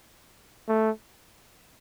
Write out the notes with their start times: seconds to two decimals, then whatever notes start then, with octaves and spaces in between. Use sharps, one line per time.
0.68 A3